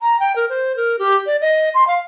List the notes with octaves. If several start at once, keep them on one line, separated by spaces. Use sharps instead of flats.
A#5
G5
A#4
C5
A#4
G4
D5
D#5
C6
F5